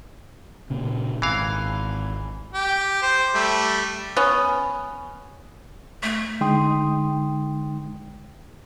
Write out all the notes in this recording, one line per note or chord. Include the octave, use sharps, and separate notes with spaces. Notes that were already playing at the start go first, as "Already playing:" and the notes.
A#2 C#3
G#1 E3 F5
G4
C5
G3 A3
B3 C#4
A3
D3 G#3 D#4 G5 C6 D#6